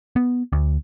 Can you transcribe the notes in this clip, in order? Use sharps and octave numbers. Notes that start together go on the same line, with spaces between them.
B3
D2